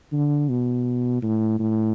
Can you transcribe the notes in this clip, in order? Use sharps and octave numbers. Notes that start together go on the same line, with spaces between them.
D3
B2
A2
A2